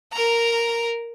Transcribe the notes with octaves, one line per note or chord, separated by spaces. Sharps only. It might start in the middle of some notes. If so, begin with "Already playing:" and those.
A#4 A#5